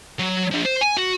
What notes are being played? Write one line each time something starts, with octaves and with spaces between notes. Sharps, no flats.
F#3
F3 D4
C5
G#5
F#4